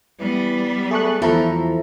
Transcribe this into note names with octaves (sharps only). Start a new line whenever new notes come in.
E3 G3 B3
A3 G#4 C#6 F#6
E2 F3 A3 E4 A4 A#5